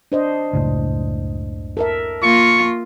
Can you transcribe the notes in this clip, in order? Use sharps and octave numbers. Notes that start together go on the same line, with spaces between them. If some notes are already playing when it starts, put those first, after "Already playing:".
D4 C5 D#5
F#1 C#2 A2
A4 A#4 E5
A#3 F4 C#6